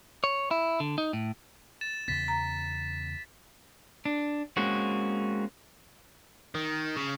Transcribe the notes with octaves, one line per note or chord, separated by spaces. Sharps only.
C#5
E4
D3
D#4
A2
A6 E7
E2 C#3 B3 A6 B6
A#5
D4
G#3 A#3 C4 C#4 F#4
D#3
C#3